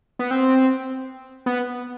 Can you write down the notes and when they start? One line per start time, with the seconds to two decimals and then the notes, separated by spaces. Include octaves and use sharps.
0.19 B3
0.31 C4
1.46 B3